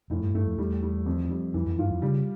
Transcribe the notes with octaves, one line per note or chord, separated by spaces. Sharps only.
F2 A2
G2
G2 A3
F2
E2 G3
G3
F2
G3
F2 E3
F2
G2 F4
F2
C#3 G3